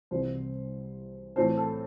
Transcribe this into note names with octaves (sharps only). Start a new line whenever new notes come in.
C2 C3 E3 G3 C4 C5
A2 E3 A3 C4 C5
A4